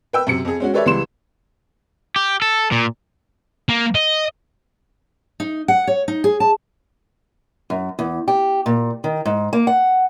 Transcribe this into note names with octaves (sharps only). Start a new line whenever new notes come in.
B4 G5 E6
F#2 C3 C#7
F2 G#4
G#3 C#4 F#4
G4 A4 B4 C#5 D5 E5
C#2 E3 G3 C6 E7
G4
A4
A#2
A#3
D#5
D#4
F#5
C#5
D#4
G#4
A5
F#2
E2
G4
A#2
D#3
G#2
A#3
F#5